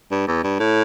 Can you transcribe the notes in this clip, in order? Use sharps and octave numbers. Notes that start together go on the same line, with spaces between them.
G2
E2
G2
A2